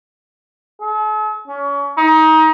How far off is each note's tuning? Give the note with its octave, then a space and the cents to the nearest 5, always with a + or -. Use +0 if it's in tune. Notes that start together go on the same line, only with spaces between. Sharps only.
A4 -45
C#4 +30
D#4 +25